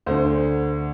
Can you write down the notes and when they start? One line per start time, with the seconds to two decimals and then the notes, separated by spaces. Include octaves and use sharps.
0.06 D2 D3 C5